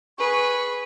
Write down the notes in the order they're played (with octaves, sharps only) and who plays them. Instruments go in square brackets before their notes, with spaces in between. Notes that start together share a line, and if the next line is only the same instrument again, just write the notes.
[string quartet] G#4 B4 [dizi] C#6